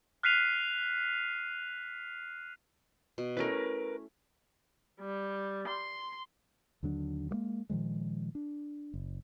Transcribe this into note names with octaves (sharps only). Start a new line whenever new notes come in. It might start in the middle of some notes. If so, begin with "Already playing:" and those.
F6 F#6 B6 C7 D#7 F7
B2
A3 C#4 E4 A#4 B4
G3
C6
D#2 D3 F#3 D4
G3 G#3 A#3
A#2 D#3 F3 G#3
D4
F#1